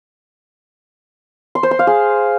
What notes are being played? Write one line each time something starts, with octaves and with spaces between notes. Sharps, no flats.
C6
C5
C6
F5
G#4